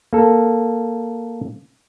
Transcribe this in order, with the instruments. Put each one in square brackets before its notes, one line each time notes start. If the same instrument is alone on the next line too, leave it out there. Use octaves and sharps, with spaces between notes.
[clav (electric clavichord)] A#3 A4